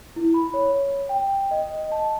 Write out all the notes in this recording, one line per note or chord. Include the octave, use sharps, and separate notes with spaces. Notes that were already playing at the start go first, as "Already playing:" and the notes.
E4
B5
C#5
G5
D#5
A5